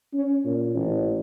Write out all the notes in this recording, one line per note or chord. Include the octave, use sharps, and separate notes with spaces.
C#4
A#2
A1